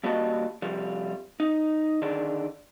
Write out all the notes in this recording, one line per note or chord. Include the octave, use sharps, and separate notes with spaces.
D#2 G3 A#3 F#4 D#5 A5
C3 F3 G3
D#4
D3 D#3 G#4 D5